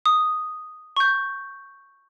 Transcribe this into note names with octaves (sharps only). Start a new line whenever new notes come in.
D#6
C#6 G6